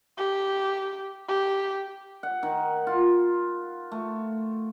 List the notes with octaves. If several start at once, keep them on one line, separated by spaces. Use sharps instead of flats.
G4
G4
F#5
D#3
F4
A3